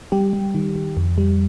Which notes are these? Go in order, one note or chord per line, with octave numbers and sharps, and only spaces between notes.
G3 G4
G3
D#3
D#3
F2
G3